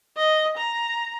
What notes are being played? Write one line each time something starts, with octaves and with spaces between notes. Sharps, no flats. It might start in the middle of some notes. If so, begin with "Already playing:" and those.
D#5
A#5